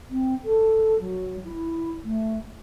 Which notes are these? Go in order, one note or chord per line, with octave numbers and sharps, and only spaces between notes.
C4
A4
F#3
E4
A3